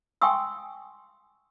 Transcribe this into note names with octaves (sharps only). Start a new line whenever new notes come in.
G5 G#5 C6 C#6 D#6 E6